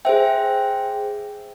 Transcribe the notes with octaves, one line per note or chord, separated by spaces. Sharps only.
G#4 C5 E5 G5